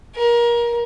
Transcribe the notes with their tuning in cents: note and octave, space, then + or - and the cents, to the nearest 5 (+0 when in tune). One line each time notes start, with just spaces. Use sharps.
A#4 +25